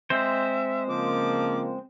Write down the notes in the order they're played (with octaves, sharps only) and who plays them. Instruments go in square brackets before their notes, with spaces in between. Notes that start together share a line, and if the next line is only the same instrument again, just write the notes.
[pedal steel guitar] G#3 C4 C5 [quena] E5
[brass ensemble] C#3 F3 A#3 [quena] D6